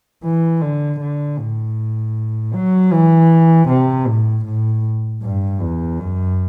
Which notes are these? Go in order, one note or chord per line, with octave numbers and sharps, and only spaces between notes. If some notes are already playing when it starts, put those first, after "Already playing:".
E3
D3
D3
A2
F#3
E3
C3
A2
A2
G2
E2
F#2